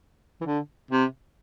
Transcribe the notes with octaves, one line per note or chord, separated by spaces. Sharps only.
E3
D3
C3